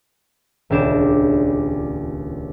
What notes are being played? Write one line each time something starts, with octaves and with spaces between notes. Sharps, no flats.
D#1 C#2 D4 G4 D7 E7